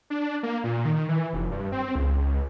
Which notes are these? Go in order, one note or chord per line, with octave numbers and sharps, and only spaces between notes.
D4
A#3
A#2
D#3
E3
F1
G2
C4
C#2